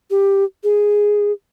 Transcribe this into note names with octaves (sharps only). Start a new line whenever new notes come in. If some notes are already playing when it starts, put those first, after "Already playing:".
G4
G#4